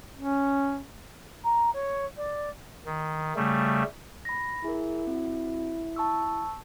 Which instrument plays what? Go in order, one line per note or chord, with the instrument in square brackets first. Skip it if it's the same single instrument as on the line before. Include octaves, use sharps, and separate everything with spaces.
[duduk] C#4
[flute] A#5
C#5
D5
[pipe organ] D#3
C#3 G3 A3
[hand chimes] B5 A#6
[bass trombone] E4 [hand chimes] G#4 A#4
[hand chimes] C4 F#4
A5 C#6 E6